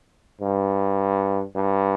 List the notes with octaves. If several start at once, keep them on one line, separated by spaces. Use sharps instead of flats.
G2
G2